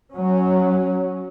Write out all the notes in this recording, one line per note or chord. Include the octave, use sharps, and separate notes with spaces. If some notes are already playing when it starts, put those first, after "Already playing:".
F#3 C#4